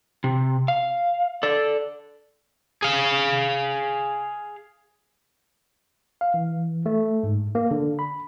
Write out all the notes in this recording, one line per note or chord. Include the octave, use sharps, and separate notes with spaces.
C3
F5
A4 D5
G#4 F5
F5
E3
A3
G#2
A#3
D3
B5